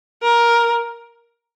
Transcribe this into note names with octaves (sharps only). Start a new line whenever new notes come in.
A#4